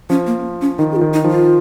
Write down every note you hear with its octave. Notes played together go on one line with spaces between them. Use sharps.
F3 C#4
A#3
C#4
D#3 D#4
G#4
F4
D#3
D#4
F3
F4